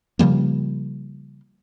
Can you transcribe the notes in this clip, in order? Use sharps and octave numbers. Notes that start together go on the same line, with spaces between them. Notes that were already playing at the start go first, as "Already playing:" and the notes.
C#3 F3 G3 A#3